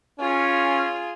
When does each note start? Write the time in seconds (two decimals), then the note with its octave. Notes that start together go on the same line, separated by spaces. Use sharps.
0.19 C#4 F4 G#4